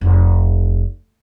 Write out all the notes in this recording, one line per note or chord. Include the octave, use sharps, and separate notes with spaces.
F1